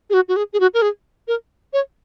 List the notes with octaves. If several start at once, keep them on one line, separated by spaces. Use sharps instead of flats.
G#4
F#4
F#4
G#4
G#4
F#4
A#4
G#4
A#4
C#5